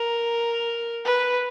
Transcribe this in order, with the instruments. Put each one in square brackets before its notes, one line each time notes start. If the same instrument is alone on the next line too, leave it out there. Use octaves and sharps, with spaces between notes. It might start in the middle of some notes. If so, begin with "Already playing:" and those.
Already playing: [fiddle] A#4
B4